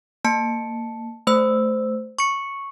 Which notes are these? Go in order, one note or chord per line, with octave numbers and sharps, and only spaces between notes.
A#3 A5 C#7
A3 C5 E6
C#6 C#7